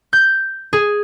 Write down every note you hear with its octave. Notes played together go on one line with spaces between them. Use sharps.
G6
G#4